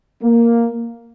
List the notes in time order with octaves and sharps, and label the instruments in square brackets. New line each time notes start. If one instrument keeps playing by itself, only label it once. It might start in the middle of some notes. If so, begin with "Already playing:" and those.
[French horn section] A#3